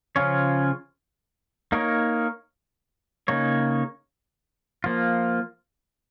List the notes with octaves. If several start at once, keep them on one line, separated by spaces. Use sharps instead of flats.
C#3 F3 C#4 F4 C#5
A#3 D#4 A#4 C#5
C#3 A#3 D#4 C#5
F3 A#3 F4